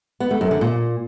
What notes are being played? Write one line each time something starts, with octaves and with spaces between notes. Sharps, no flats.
B3
A3
F#2
D3
A#2